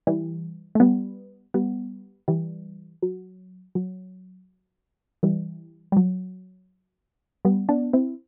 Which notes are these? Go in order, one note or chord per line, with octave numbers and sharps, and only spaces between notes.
E3 G3
A3
G3 B3
G3 B3
E3 G3
F#3
F#3
E3 G3
G3
F#3
G3 B3
B3 D4
C4 E4